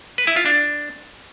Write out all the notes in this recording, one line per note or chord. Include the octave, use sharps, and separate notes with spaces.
B4
E4
F4
D4